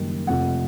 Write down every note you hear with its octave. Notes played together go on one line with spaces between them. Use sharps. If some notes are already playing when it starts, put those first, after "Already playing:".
Already playing: F#1 F#2 D#3 G3
F1 F2 C3 F#5